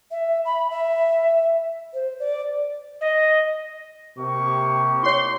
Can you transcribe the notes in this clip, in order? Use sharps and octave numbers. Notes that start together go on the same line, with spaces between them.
E5
B5
E5
C5
D5
D#5
C3 A#3 G4 C#6
E4 C#5 C6